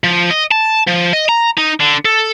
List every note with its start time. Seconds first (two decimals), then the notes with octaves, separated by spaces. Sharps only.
0.04 F3
0.31 D#5
0.52 A5
0.88 F3
1.13 D#5
1.29 A#5
1.57 D#4
1.80 D3
2.05 A4